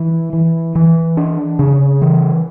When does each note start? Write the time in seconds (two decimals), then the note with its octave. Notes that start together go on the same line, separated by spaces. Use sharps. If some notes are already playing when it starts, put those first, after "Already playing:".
Already playing: E3
0.33 E3
0.75 E3
1.17 D4
1.59 C#3
2.01 E3